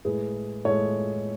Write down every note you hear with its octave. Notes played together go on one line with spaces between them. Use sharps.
A2 G#3 G#4 B4
A2 G#3 A4 C#5